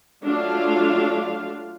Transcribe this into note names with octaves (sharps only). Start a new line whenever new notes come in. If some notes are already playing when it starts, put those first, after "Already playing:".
F#3 A3 D4 F4 F5